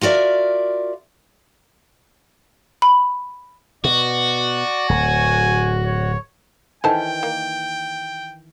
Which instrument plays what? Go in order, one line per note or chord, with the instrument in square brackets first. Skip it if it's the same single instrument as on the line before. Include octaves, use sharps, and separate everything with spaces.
[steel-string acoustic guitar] F4 F#4 A#4 D5 E5
[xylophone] B5
[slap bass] B2 [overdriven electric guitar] F#4 [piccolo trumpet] D5
[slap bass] D1 [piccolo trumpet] G#5
[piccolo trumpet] C#5
[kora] D#3 E3 [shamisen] A4 C5 A5 [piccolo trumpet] G5
[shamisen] A#3